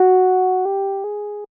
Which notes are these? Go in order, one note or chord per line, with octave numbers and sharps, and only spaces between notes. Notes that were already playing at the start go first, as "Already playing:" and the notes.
Already playing: F#4
G4
G#4